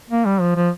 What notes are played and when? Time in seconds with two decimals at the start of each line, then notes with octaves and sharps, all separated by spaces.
0.10 A#3
0.26 G3
0.41 F3
0.56 F3